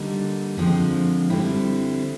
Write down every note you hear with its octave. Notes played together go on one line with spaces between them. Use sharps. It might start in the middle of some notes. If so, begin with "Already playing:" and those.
Already playing: D3 G3 A#3 D#4
D3 F3 G#3 C4
D3 G3 C4 E4